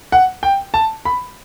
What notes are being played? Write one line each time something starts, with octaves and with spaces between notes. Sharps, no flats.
F#5
G5
A5
B5